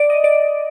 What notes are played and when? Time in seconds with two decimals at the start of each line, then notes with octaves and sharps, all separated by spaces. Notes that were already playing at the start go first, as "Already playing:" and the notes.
Already playing: D5
0.10 D#5
0.24 D5